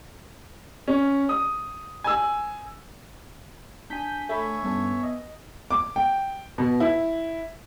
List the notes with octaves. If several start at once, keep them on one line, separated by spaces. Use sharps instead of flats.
C#4
D#6
G#5 E6
D4 G#5 G6 B6
A3 C#5 E5 B5
G2 B3 C#4 A4
D#5
D6
G5
B2
E4